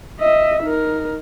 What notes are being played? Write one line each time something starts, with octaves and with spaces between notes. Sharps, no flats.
D#5 E5
D#4 A#4